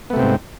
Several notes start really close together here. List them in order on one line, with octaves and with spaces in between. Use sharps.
B3 A3 C3 C4 G#2